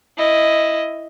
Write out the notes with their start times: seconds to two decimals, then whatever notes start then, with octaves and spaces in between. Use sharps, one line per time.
0.18 E4 D#5